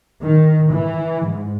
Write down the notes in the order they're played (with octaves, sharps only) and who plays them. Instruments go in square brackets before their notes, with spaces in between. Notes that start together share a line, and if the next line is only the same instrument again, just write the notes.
[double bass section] D#3
E3
G#2